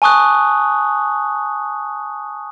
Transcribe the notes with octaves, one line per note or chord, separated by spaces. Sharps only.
G#5 A5 C#6 D#6 F#6